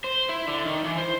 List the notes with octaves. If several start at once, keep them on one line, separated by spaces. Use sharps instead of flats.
C5
E4
D3
D#3
E3
C5